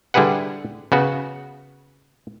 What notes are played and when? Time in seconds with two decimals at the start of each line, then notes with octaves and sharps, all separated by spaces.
0.14 D3 G3 E4 G#4 B4 F#5
0.92 C#3 B3 F#4